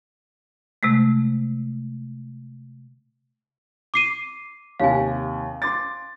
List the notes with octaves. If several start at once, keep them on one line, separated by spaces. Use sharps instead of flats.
C3 G#3 A3
D6 C7 D#7
D#2 C3 F5 G#5
C6 D6 A6